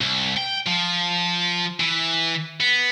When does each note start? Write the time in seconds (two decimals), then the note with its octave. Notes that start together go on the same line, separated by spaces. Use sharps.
0.01 C2
0.37 G5
0.66 F3
1.80 E3
2.61 B3